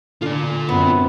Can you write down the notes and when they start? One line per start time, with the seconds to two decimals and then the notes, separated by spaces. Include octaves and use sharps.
0.22 D3 F4 D5
0.69 F#2 B3 C4